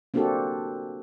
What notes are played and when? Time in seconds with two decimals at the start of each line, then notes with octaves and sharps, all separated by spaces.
0.14 A#3 C4 D4 F#4 G4 A4